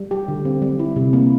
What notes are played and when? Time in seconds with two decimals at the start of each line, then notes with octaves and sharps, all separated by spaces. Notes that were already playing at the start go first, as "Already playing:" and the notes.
Already playing: G3
0.11 G4
0.28 D3
0.45 C4
0.62 G3
0.79 E4
0.96 C3
1.13 A#3